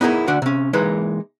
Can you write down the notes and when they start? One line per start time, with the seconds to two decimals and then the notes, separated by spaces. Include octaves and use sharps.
0.01 B3 D#4 E4 G#4 A#4
0.27 D3 D4 F#4 F#5
0.42 C3 C#4
0.73 E3 G#3 A#3 D#4 B4